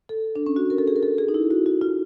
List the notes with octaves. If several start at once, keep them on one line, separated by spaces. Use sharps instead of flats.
A4
D4
C#4
F#4
A#4
A4
G#4
A#4
A4
G#4
D#4
E4
F#4
F#4
F4